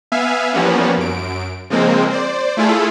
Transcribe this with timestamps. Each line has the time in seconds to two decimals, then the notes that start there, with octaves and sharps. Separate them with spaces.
0.12 B3 E5 F5 G#5
0.53 E3 F3 G3 A#3 B3 C#4
0.97 F#2 D7
1.70 C#3 F3 G#3 A#3 C4
2.10 C5 D5
2.57 A3 E4 F4 G#4 A4